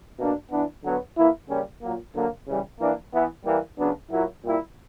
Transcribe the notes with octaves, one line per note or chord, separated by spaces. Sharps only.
B2 A#3 D4
E3 B3 D4
D3 F#3 B3
E3 A#3 E4
C#3 G3 A#3 C#4
A#2 F#3 A#3
D3 F#3 A#3
C#3 E3 G3
E3 A#3 D4
E3 B3 E4
E3 G3 A#3
C#3 F#3 B3 D4
A#2 F#3 A#3 E4
A#2 G3 A#3 E4